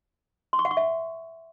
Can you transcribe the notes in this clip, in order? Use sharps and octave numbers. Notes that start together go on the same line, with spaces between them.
C6
C#6
F#5
C#6
E5